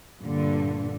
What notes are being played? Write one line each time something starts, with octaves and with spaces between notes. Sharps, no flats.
G2 A#2 D3